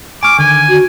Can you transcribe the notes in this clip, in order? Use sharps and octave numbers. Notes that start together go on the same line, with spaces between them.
G#5 C#6 D6 F6
D3 D#3 G#5
F#4